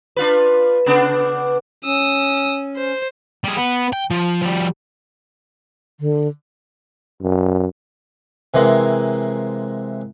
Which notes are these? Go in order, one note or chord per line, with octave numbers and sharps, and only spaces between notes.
D4 F4 B4
C#3 B3 D4
C#4 D#6 E6
C5
G3 G#4
B3
G5
F3
F3 G3
D3
F#2
C3 E3 G#3 A#3